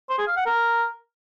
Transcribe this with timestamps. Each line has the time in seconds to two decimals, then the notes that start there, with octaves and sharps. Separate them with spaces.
0.09 C5
0.18 G#4
0.28 F5
0.37 F#5
0.46 A#4